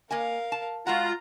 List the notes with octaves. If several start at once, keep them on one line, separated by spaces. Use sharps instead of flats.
A#3 A#4 D#5 F5 G#5
A5
G#3 F4 F#4 F#5 A#5